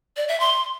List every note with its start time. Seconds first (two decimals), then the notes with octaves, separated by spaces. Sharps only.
0.17 D5
0.28 E5
0.40 C6